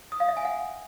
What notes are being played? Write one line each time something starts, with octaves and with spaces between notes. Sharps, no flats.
D#6
F5
E5
G#5
F#5